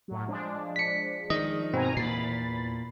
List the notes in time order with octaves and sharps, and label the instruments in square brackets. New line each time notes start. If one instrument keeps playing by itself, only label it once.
[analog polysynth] A2 F#3
F3 G#3 D4
[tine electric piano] B6 C#7
[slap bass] D#3 [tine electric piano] D#5
[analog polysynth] G2 G#5 A#5 [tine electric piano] B2 C4
[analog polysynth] E2 B5 A6 [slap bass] A#2 [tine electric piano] C7